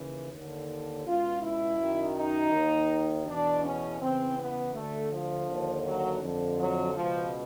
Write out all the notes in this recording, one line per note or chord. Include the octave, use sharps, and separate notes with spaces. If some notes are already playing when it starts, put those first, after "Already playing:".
Already playing: D#2 C#3 E3
D#2 D3
C#2 B2 F4
E4
F#2 D#3
D#4
D#2 D#3
E2 B2 D4
C#4
E2 C#3 E3 C4
B3
D2 D3 A3
F3
D#2 D3
F#3
F2 D3
F#3
C#2 B2 F3